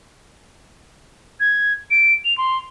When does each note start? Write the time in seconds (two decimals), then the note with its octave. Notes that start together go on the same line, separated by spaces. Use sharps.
1.40 G#6
1.91 D7
2.25 F7
2.38 C6